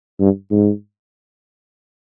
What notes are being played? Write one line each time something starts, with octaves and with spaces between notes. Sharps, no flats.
G2
G#2